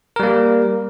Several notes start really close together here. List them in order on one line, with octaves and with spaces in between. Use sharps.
A#4 G3 A#3